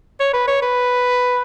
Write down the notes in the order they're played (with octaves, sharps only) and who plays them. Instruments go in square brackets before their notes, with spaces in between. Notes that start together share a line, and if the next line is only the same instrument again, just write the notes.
[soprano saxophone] C#5
B4
C#5
B4